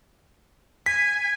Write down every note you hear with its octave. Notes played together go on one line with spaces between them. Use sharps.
G#5 B6